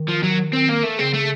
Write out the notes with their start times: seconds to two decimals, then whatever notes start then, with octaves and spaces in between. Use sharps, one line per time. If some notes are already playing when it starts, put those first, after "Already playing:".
Already playing: D#3
0.08 F3
0.23 F#3
0.53 C4
0.69 A#3
0.83 A3
0.99 C#3 C4
1.13 A3